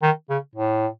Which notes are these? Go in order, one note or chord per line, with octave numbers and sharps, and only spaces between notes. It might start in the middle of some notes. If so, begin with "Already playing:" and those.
D#3
C#3
A2